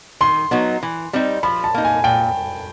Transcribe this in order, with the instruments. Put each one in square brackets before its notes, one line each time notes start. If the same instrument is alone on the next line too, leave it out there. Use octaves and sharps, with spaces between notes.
[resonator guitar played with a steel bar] D#3 [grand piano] C6
[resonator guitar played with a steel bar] F#3 B3 D#4
E3
G3 C4 D#4
[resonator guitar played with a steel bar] F3 [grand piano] B5
[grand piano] A5
[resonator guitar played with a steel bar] A#3 D#4
[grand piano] G#5
[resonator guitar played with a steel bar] A#2 [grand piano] G5